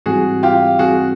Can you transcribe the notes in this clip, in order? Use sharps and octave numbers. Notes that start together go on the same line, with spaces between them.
G#2 E3 G3 C4 E4 F#4 G#4
F4 G4
G#2 E3 G3 C4 E4 F#4 G#4